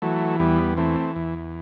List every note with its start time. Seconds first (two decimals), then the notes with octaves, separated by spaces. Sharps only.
0.02 E3 F#3 A3
0.40 E2 G3 B3
0.77 E3 A3 C4
1.16 E2